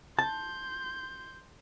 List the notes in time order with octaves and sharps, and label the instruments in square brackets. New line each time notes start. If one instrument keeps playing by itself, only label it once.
[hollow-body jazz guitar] A5 [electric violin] C6 G6